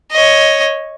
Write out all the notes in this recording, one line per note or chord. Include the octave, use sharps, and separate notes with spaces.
C#5 D#5